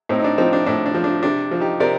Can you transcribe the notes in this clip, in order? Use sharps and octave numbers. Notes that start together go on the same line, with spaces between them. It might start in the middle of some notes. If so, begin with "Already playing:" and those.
A2 C4 D#4
D#4
D4
F3 C4 D#4
D4
A2 D4
D4
F3
D4
C3 D4
F3
D#4 G4
C3 A#4 D5